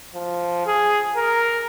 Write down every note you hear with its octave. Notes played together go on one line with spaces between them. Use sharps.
F3
G#4
A#4